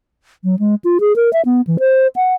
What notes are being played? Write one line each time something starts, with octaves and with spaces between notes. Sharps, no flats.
F#3
G#3
F4
G#4
A#4
E5
B3
E3
C5
F#5